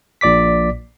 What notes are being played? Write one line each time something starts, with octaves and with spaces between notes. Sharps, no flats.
A#1 A#2 D5 D6 B6